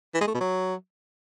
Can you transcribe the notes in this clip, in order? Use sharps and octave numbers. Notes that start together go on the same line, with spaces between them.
E3
G#3
A3
B2
F#3